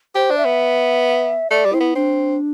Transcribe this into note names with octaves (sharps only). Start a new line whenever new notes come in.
G4 C5
D4
E5
B3
A3 D5
G3
C4 E4
B3
C4 D4